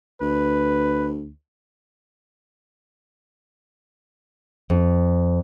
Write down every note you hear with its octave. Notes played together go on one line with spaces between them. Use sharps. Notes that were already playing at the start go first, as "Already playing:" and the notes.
D2 B4
F2